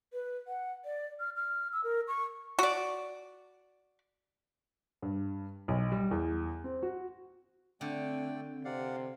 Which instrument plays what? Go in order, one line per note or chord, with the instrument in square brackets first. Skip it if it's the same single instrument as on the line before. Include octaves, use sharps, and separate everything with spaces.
[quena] B4
F#5
D5
F6
F6
E6
A#4
C#6
[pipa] F#4 D5
[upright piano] G2
B1
G3
E2
C4
F#4
[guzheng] D3 [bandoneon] A3 D5 G5 [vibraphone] C4
[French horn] C3 [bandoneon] D5 F5 F#5